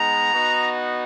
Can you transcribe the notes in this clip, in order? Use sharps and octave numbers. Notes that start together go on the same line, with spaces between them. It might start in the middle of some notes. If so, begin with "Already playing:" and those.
Already playing: G#3 B3 D#4 A#5
B3 D#4 F#4